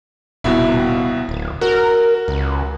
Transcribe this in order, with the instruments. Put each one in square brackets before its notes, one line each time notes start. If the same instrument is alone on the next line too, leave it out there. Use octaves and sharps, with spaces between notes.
[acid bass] D#1 [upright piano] C2 B2 E4
[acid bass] D1
[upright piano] F#4 [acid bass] A#4
[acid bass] C#2